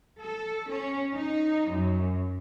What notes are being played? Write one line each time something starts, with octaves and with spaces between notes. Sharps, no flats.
A4
C#4
D#4
F#2